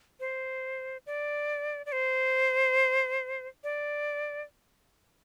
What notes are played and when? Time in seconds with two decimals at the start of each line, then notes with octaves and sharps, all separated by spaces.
0.20 C5
1.06 D5
1.86 D5
1.92 C5
3.64 D5